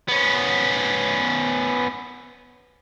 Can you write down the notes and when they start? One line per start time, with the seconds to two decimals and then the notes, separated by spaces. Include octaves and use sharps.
0.08 B3 C#4